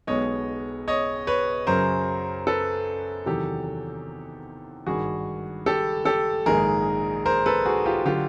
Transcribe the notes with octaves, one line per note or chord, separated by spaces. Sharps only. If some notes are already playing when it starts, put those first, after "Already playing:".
B1 B2 G#3 B3 C#5 D#5
C#5 D#5
B4 C#5
F#2 C#3 F#3 A#4 C5
A4 B4
E2 C3 D#3 F#3 G4 A4
G#1 G2 D#3 F#4 G#4
G4 A4
G4 A4
A#1 G#2 D#3 G#3 G#4 A#4
A#4 C5
A4 B4
F#4 G#4
F4 G4
D3 F#3 F4 G4